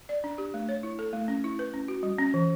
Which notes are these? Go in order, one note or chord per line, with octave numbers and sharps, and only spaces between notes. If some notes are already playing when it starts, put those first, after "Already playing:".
D5
D4
G4
A3
C#5
E4
A4
A3
C#4
E4
B4
C#4
F#4
G3
C#4
E3